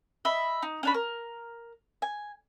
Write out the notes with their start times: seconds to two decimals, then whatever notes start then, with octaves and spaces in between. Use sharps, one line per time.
0.25 D#5 E5 B5
0.62 D#4
0.83 C#4 D4 B5
0.94 A#4
2.02 G#5